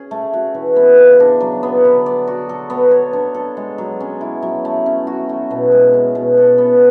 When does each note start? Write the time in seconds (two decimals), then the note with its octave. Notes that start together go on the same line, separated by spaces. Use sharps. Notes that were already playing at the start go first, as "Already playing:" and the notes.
Already playing: C#4 G#4
0.11 A3
0.33 F#4
0.54 E3
0.76 B3
0.98 C#3
1.20 D4
1.40 F#3
1.63 B3
1.85 D3
2.06 D5
2.27 F#4
2.49 A4
2.70 B3
2.91 C#5
3.13 D4
3.34 A4
3.57 G#3
3.78 F#3
4.00 C#4
4.21 E4
4.42 F#3
4.65 A3
4.86 C#4
5.07 F#4
5.29 A3
5.51 B2
5.72 G#3
5.93 C#4
6.15 B2
6.38 A4
6.58 B3